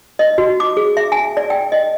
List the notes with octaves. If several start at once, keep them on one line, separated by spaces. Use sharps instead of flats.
D#5
F#4
D6
G#4
E5
G#5
D5
G5
D#5